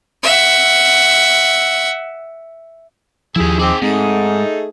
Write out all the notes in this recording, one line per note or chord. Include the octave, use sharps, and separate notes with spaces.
E5 F#5
D#2 F3 E4 G4 G#4
C4 D#4 G#4 G5 D6
G#2 A3 C4 D#4 G#4